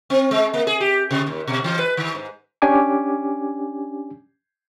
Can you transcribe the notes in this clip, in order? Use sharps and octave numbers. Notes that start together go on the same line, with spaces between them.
C4
G#3
A#3
G#4
G4
C3
D#2
B2
E3
B4
D#3
G#2
C#4 D4 G4 G#5 D6